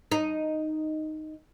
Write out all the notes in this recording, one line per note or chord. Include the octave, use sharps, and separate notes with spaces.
D#4